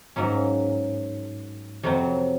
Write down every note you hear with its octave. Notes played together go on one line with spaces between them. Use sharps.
G#2 F#3 A#3 C#4
F2 C3 F#3 C4